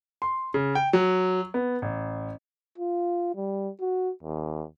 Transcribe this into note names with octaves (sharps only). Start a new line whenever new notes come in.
C6
C#3
G5
F#3
B3
A1
F4
G3
F#4
D#2